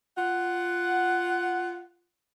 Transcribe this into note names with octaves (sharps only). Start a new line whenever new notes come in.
F4 F#5